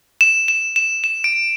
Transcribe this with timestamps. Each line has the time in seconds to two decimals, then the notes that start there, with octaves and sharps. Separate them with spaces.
0.21 E7
0.48 E7
0.76 E7
1.04 E7
1.24 D7